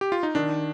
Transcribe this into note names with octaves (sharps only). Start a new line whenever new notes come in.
G4
F4
D#4
D#3 D4